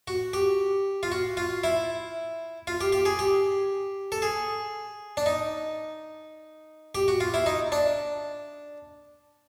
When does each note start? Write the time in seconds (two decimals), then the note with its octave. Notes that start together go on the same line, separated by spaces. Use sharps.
0.08 F#4
0.33 G4
1.03 F4
1.12 F#4
1.37 F4
1.64 E4
2.67 F4
2.81 G4
2.92 G4
3.05 G#4
3.19 G4
4.12 A4
4.22 G#4
5.17 D4
5.26 D#4
6.95 G4
7.08 F#4
7.20 F4
7.34 E4
7.46 D#4
7.72 D4